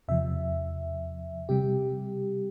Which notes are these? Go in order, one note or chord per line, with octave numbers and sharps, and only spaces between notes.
E2 C3 F3 E5
C3 G3 G4